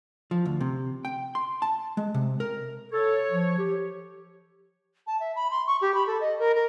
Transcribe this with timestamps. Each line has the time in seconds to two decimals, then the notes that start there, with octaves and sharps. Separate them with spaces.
0.31 F3
0.45 D2
0.61 C3
1.05 G5
1.35 C6
1.62 A5
1.97 G#3
2.14 C3
2.40 A#4
2.92 A4 C#5
3.31 F3
3.59 G4
5.07 A5
5.20 E5
5.35 B5
5.51 C6
5.67 C#6
5.81 G4
5.94 B5
6.07 A4
6.21 D#5
6.39 A#4
6.55 A#4